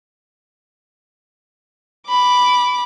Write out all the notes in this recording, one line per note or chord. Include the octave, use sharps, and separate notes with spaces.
B5 D6